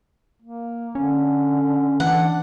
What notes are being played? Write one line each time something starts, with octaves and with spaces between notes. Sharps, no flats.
A#3
D3 C#4
E3 D4 F#5